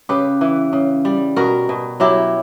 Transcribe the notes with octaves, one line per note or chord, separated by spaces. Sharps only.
C#3 G4 B4
E3
C#3
G3
B2 F#4 A#4
B2
F#3 E4 G4